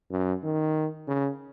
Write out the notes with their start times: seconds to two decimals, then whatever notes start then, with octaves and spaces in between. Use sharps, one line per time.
0.11 F#2
0.43 D#3
1.08 C#3